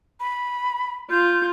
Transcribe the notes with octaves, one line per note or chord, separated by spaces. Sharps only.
B5
F4 G6